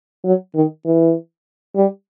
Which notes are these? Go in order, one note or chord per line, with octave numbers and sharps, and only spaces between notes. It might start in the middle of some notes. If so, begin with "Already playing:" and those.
F#3
D#3
E3
G3